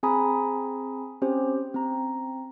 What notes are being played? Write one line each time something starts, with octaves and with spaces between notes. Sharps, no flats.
C4 G#4 G#5 A#5 B5 D#6
C4 C#4 G4 C5
C4 A#5